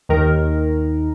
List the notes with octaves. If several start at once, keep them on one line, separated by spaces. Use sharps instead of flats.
D#2 D#3 A#4